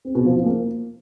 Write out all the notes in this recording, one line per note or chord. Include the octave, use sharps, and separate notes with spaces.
C4
B2
F3
F3
A#3